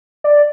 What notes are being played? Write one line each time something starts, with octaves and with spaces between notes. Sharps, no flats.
D5